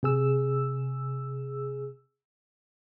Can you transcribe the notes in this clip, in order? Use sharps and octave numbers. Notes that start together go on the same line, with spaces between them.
C3 G#4 E6